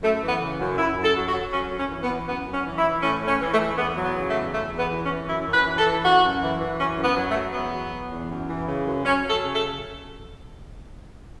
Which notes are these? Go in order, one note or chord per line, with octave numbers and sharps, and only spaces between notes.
F#2 A3
E3
B3
C#3
F#2
F#2 E4
F#2
A4
F#3
F#4
F#3
F#2 C#4
F#2
C#4
E3
B3
E3
F#2 B3
F#2
C#4
E3
E4
E3
A2 C#4
A2
C#4
E3
A3
E3
E2 B3
F#3
B3
C#3
A3
E2
E2 A3
E2
B3
E3
C#4
E3
F#2 E4
F#2
B4
E3
A4
E3
F#2 F#4
F#2
E3
E3
F#2 C#4
F#2
B3
F#3
A3
F#3
E2 B3
F#3
B2
E2
F#2
E3
C#3
F#2
F#2 C#4
F#3
A4
C#3
A4